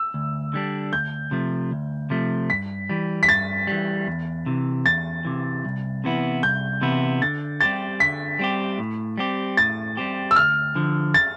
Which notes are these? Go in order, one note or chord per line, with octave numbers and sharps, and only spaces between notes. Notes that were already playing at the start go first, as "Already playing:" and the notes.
Already playing: E6
D2
D3 G3 D4
D2 G6
C3 F3 A3
D2
C3 F3 A3
G2 B6
E3 G3
B6
G2 A6
E3 G3
E2
C3 E3
E2 A6
C3 E3
C2
C3 E3 B3 E4
C2 G6
C3 E3 B3 E4
D3 A6
G3 C4 G4 A6
D3 B6
G3 C4 G4
A2
G3 C4 G4
A2 A6
G3 C4 G4
E6
D2 F6
D3 F3
A6